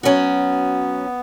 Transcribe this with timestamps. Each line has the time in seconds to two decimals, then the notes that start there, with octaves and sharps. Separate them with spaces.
0.03 F#3 B3 C#4 F#4